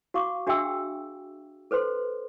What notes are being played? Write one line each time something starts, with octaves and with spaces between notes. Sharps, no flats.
F#4 F5 C#6 D6
D4 F#4 G#4 E5 G5 E6
A4 B4 C5 C6